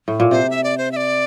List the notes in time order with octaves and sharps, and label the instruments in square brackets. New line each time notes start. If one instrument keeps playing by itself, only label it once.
[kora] A2
A#2
[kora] C3 [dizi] C5
[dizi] E5
D5
C5
E5
D5